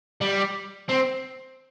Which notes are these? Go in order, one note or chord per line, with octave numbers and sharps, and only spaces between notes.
G3
C4